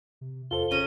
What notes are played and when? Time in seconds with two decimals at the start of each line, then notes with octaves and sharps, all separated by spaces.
0.21 C3
0.51 E2 F4 A4 C5 G7
0.71 G1 C#3 C#4 A#5 D#7